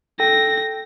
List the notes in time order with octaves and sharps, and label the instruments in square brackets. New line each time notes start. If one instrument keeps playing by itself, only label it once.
[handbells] A4 G5 [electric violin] A#6